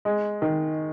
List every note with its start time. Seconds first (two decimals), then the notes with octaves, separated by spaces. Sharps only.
0.05 G#3
0.42 D#3